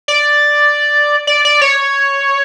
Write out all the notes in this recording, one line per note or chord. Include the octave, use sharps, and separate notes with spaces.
D5
D5
D5
C#5